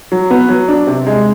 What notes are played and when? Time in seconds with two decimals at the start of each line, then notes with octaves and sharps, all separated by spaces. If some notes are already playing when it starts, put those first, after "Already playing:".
0.12 F#3
0.30 B3
0.49 F#3
0.68 D4
0.87 C3
1.07 G#3